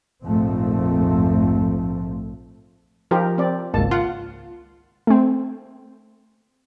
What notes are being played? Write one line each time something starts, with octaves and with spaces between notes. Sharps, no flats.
A#1 F2 G#2 F3 A3 C4
F3 D#4 G4 A#4
C4 D5
G#1 C#2 A#3 A5
F4 F#5
A3 C4